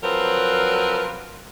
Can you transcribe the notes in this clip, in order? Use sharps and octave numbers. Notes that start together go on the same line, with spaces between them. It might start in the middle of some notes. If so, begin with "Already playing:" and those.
F3 F#3 C4 A#4 B4